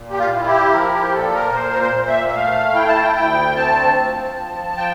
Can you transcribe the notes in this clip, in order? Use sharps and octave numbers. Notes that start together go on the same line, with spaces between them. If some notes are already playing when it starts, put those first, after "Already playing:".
Already playing: A#2
G4
F4
E4
G4
F3 A#4
G4
A#2 A4
A#4
A#2 C5
A#4
C5
A#2
E5
E5
A3 F5
E4 G5
A5
G5
D2 G5
C4 A5
F3
F3
G5